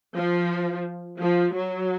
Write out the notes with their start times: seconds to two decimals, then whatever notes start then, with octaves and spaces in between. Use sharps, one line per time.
0.14 F3
1.18 F3
1.53 F#3